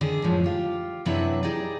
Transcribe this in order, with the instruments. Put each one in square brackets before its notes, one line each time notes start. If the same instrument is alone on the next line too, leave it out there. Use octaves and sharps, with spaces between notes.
[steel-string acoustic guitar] D3 D#3 G#4
F#2 A2 F3 G#3
F4 G4
F#2 C3 F#3 D4 E4 B4
D#4 G4 G#4 D5